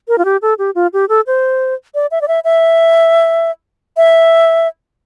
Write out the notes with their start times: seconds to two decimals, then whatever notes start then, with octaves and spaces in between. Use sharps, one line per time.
0.08 A#4
0.18 F4
0.25 G4
0.42 A4
0.59 G4
0.75 F4
0.93 G4
1.09 A4
1.27 C5
1.95 D5
2.11 E5
2.21 D5
2.28 E5
2.45 E5
3.97 E5